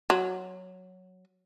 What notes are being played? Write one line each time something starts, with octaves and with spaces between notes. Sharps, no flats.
F#3